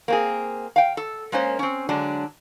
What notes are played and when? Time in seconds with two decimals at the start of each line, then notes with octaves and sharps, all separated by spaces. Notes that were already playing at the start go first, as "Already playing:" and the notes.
0.08 A#3 C4 G#4
0.76 F5 G5
0.97 A4
1.32 G#3 A#3 C#4 C5
1.59 C4 C#4
1.89 D3 F#3 G#3 D4